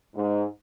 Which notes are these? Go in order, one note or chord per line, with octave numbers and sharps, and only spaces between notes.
G#2